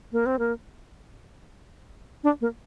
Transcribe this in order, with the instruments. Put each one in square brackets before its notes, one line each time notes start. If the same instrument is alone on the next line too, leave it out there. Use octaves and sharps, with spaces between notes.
[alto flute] A#3
C4
A#3
D4
A#3